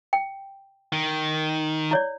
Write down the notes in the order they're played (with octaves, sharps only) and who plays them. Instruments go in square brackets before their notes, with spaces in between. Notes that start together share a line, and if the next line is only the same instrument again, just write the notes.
[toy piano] G5
[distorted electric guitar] D#3
[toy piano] E4 C#5 D5